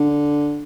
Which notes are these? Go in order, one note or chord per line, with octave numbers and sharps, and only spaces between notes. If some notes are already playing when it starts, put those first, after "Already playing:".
Already playing: D3